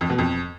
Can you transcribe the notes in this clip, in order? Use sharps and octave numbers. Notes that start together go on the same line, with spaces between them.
F2
B2
F2